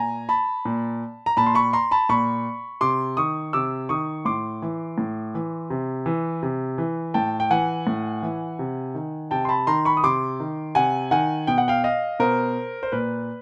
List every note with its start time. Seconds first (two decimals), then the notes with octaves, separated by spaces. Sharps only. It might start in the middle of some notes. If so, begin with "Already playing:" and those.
Already playing: A#2 G#5 A#5
0.29 A5 B5
0.65 A#2
1.26 A#5
1.37 A#2 A5 B5
1.46 C6
1.54 B5 C#6
1.73 A#5 C6
1.91 A5 B5
2.09 A#2 B5 C#6
2.81 C3 C6 D6
3.17 D#3 C#6 D#6
3.53 C3 D6 E6
3.89 D#3 C#6 D#6
4.25 A2 C6 D6
4.62 E3
4.98 A2
5.35 E3
5.70 C3
6.06 E3
6.43 C3
6.78 E3
7.14 A2 G5 A5
7.40 G5
7.50 E3 F#5 G#5
7.87 A2
8.22 E3
8.59 C3
8.95 D#3
9.31 C3 G5 A5
9.45 C6
9.49 A5 B5
9.67 D#3 A#5 C6
9.85 B5 C#6
9.97 D#6
10.03 C3 C6 D6
10.40 D#3
10.75 C3 F#5 G#5
11.11 D#3 F#5 G#5
11.47 B2 G5
11.58 F#5
11.68 F5 G5
11.84 D#5 F5
12.19 B2 A#4 C5
12.83 C5
12.92 A#2 B4